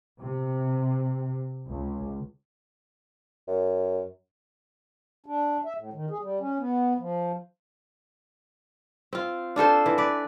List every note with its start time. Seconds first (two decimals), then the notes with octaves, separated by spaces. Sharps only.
0.20 C3
1.67 C#2
3.48 F#2
5.26 D4
5.65 E5
5.77 A2
5.93 D#3
6.10 G#4
6.22 G3
6.40 C#4
6.59 B3
6.98 F3
9.13 C4 F4
9.56 D4 F4 A4 C5
9.86 E3
9.98 B4 D5